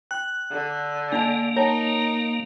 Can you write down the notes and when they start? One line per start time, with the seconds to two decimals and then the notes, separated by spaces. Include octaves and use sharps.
0.11 G5 F#6
0.51 D3
1.12 A#3 D4 D#5 A5
1.56 D#4 A#4 C#5 G5 A5